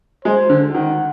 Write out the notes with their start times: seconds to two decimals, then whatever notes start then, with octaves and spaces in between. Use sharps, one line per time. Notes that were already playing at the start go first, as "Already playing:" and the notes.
0.25 G#3 C5
0.50 D3
0.74 D#3 F#5